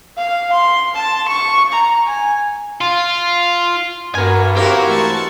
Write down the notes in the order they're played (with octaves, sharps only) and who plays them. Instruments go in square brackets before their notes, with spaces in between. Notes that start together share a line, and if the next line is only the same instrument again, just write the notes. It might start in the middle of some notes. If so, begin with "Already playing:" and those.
[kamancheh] F5
C6
A5
C#6
A#5
G#5
[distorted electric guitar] F4
[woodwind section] G2 [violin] B3 F#4 [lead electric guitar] A#4 G#5
[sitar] C4 E4 F#4 [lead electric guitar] G4 A#4 [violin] F5
[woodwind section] E3 G#3 A3 [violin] A5 C#6